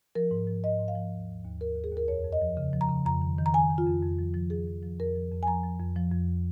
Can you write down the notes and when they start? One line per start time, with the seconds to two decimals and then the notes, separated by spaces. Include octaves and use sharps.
0.15 F3 A#4
0.31 G#2
0.47 F3
0.64 G#2 D#5
0.79 G#2
0.88 F5
0.95 F3
1.13 D#2
1.28 D#2
1.44 D#2
1.60 D#2 A#4
1.76 D#2
1.84 G#4
1.92 D#2 A#4
2.08 F2 C#5
2.24 F2
2.33 D#5
2.42 F3
2.57 C#3
2.73 F3
2.81 A#5
2.89 C#3
3.06 F2 A#5
3.22 D#3
3.38 D#3
3.46 A#5
3.54 D#3 G#5
3.70 D#3
3.78 F4
3.86 F2
4.03 F2
4.19 F3
4.34 F3
4.50 F3 G#4
4.67 F3
4.83 F3
5.00 F2 A#4
5.15 F3
5.32 F2
5.43 G#5
5.47 F3 A#5
5.64 F3
5.80 F2
5.96 F3
6.11 F2